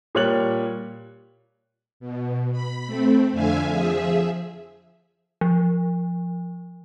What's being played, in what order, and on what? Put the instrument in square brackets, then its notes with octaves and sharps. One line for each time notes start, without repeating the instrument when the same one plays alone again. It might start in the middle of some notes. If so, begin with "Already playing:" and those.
[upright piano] A#2 G3 C#5 F#6 F#7
[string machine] B2
B5
A3 C4
F2 D3 E5 F5 G#5
F3 G#4 E5
[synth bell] F3